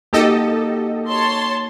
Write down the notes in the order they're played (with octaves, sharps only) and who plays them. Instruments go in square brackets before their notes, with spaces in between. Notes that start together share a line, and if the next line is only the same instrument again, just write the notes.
[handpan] A#3 D#4 F#4 [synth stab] G4 A4 D#5
[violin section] C#5 A5 C6